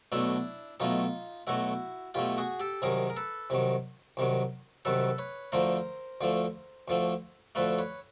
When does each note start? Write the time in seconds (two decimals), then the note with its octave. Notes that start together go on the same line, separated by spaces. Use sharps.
0.12 B1 B2 F#3 A3 D4 E4
0.80 B1 B2 F#3 A3 D#4 F4
1.47 B1 B2 F#3 A3 E4 F#4
2.14 B1 B2 F#3 A3 F4 G4
2.38 F#4 G#4
2.60 G4 A4
2.82 C2 C3 D#3 F#3 G#4 A#4
3.10 A#4
3.17 A4 B4
3.50 C2 C3 D#3 F#3
4.17 C2 C3 D#3 F#3
4.85 C2 C3 D#3 F#3 A4 B4
5.18 B4 C#5
5.52 D2 D3 F3 A3 A#4 C5
6.21 D2 D3 F3 A3
6.88 D2 D3 F3 A3
7.55 D2 D3 F3 A3 A4 B4
7.79 B4 C#5